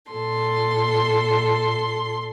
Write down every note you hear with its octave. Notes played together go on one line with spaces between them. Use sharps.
A#2 A4 C6